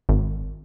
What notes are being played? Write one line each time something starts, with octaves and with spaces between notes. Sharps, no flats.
G#1